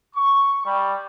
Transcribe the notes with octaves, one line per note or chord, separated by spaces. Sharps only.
C#6
G3